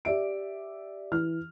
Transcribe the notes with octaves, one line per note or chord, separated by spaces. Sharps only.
G4 D5 E5 D7
E3 F6